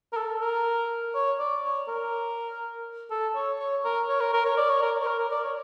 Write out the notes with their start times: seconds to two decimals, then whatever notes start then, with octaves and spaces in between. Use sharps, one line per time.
0.13 A#4
0.17 A4
0.41 A#4
1.15 C#5
1.39 D5
1.64 C#5
1.88 A#4
3.11 A4
3.35 C#5
3.59 C#5
3.84 A#4
4.09 C#5
4.20 A#4
4.33 A#4
4.45 C#5
4.58 D5
4.69 C#5
4.82 A#4
5.02 C#5
5.07 A#4
5.19 A#4
5.31 D5
5.43 C#5